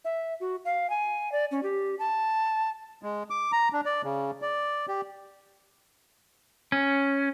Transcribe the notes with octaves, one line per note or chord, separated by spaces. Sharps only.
E5
F#4
F5
G#5
D5
C#4
G4
A5
G#3
D6
A#5
D4
D5
C#3
D5
G4
C#4